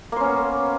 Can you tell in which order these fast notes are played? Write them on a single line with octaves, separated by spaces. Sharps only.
A#3 C5 C#4 B3